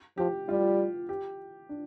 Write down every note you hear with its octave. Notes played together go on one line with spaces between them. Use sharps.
F3 G4
G3 F4
G4
D4